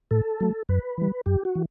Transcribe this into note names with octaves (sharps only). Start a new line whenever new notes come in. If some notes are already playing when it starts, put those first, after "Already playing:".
A2 A4
F#3 A3
F#2 B4
E3 G3
F#2 G4
F#4
E3